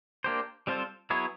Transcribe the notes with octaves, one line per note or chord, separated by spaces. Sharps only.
A#3 D4 G4 C5
G3 C4 F4 A4 C5
F#3 B3 E4 G#4 C#5